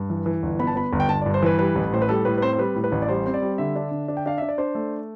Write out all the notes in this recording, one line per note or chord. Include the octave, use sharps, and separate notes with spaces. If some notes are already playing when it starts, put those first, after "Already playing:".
Already playing: G2
E3
E3
G1
B3 B5
A5
B3 B5
G1
G5
G1 A5
D5
G2
C5
E3 B4
G3 B4
A1
A2 C5
B4
G3 A4
A2 B4
B4
C4 C5
C5
G3 B4
A2
B4
A1
D5
G3 C5
C4 C5
D5
G3
D3 E5
D4
D3
D4
G5
D4 F5
D4 E5
D5
D4 C5
A3